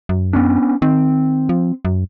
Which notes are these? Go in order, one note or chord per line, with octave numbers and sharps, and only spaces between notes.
F#2
B3 C#4 D4
D#3 C4
F3
F#2